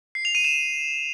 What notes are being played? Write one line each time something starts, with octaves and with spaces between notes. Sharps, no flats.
C7
F7
D#7
E7